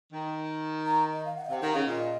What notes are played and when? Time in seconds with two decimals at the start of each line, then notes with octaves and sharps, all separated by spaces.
0.12 D#3
0.86 A#5
1.13 D#5
1.25 F5
1.37 F#5
1.44 D#5
1.49 C3 F5
1.61 D#3 F#5
1.73 C#3 F5
1.86 A#2 D#5